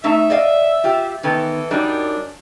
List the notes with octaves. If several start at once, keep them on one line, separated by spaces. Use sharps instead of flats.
A3 D#4 E5
D5 D#5 F5
F4 G4
D#3 E3 B3 A4
F#2 G3 D4 D#4